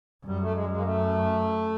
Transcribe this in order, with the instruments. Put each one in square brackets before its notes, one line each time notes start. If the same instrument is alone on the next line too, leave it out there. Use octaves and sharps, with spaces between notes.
[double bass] F#2 [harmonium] G3
[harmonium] A3
G#3
G3
G#3
A#3
A3